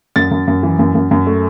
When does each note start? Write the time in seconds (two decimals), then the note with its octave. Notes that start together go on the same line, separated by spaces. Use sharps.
0.16 F#2 A6
0.31 F#2
0.48 F#2
0.63 E3
0.79 F#2
0.95 F#2
1.11 F#2
1.26 A3